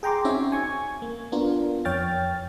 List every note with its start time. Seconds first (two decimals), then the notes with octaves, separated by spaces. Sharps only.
0.03 G#4 G5 A#5 C6 D6
0.25 C4 C#4 D#4 F#4 C#5 E5
0.52 G#5 C#6 G#6
1.02 A#3
1.32 B3 D4 F4 A#4
1.85 F2 C#5 G5 F6 A6